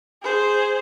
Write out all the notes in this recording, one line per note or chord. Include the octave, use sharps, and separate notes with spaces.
G#4 C5